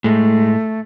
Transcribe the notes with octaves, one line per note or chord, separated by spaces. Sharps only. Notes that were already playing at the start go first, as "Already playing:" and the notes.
A2 G#3 A3